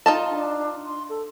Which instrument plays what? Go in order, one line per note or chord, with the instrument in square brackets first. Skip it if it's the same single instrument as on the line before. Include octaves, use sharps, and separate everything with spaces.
[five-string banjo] D#4 F4 A5
[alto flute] D4
C6
A4